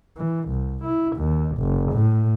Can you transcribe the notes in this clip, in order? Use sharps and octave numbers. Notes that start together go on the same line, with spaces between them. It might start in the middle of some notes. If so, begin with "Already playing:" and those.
E3
C2
E4
D#2
F#1
A2